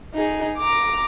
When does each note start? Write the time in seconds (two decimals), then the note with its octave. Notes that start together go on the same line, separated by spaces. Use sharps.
0.14 D#4 G#4
0.58 A#5 D6